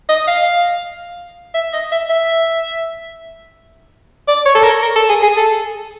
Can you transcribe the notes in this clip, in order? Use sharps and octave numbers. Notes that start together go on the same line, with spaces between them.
D#5
F5
E5
D#5
E5
E5
D5
C#5
A4
A#4
A#4
A4
G#4
G#4
A4